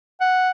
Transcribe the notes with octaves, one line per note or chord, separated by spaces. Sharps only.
F#5